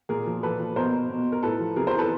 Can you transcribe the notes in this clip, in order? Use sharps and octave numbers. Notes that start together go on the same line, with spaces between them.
A#2 G#4 A#4
F3
A#2 A4 B4
F3
B2 A#4 C5
B2
A#4
A2 A4 B4
F3
C3 G#4 A#4
A#4 C5
E3
A4 B4